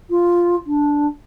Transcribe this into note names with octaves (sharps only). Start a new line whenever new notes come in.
F4
D4